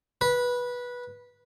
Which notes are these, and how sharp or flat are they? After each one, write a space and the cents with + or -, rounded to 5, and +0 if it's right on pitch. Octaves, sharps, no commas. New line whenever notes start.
B4 -15